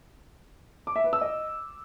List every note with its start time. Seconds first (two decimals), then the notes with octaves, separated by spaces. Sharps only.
0.87 D6
0.96 E5
1.04 B4
1.13 E6
1.21 D#5